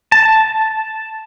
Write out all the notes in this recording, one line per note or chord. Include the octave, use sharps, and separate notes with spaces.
A5